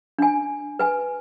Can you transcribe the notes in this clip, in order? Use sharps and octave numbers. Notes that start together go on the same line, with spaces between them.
D4 G#5
B4 G#5